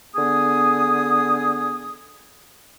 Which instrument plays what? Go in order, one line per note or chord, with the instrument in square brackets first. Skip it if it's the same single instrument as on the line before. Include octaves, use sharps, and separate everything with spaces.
[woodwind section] D3 B3 G#4 D#6